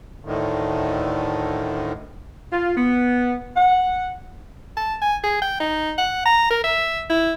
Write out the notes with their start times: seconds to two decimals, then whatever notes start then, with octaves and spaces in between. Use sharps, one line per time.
0.25 D2 A2 D3 D#3
2.51 F4
2.76 B3
3.56 F#5
4.77 A5
5.02 G#5
5.24 G#4
5.42 G5
5.60 D#4
5.98 F#5
6.26 A#5
6.51 A#4
6.64 E5
7.10 E4